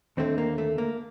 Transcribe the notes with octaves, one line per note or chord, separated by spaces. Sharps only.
D#2 D3 A3 C4
A#3
A3
A#3